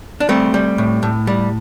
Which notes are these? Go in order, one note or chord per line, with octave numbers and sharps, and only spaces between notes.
D4
G3 A3 C4
G3
A2
A2
G3